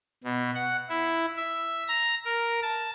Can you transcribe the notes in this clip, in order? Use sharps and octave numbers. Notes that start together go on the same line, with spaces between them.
B2
F#5
E4
E5
A#5
A#4
A5